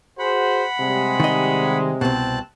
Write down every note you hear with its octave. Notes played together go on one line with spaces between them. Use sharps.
F#4 G#4 C5 F#5 B5
C3 G3 G#3
D#3 D#5
C2 B2 C4 A5 F#6